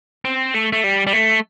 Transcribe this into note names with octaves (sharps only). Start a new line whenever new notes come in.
C4
A3
A3
G3
G3
A3